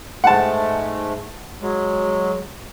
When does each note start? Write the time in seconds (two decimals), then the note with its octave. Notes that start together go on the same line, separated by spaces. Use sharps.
0.24 G#2 G#3 A3 F#5 A5
1.62 F#3 G#3